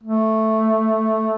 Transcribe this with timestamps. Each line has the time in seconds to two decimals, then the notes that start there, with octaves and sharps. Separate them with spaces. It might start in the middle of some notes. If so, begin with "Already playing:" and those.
0.03 A3